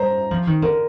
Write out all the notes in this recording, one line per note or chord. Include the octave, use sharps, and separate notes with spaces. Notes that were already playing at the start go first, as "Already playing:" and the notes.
Already playing: G3 C5 A#5
F3
D#3
D3 A#4